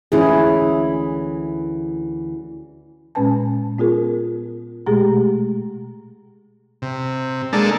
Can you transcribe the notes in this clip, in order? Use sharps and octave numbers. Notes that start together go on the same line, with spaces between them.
D2 E3 C#4 E4 G#4
A#2 G#3 C#4 B4 G#5 A5
B3 F4 G#4 A#4
B2 G#3 A3 G4 G#4 A#5
C3
G#3 A#3 D4 A4